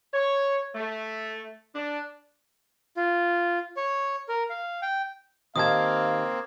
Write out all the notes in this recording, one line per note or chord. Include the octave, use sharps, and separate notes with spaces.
C#5
A3
D4
F4
C#5
A#4
F5
G5
D#3 A#3 C4 G4 F5 A5 D#6 G#6